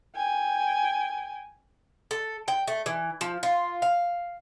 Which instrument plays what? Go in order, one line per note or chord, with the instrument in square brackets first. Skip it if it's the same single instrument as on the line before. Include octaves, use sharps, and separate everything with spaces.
[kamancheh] G5 G#5
[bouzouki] A4
G5
A3
E3
F3
F4
F5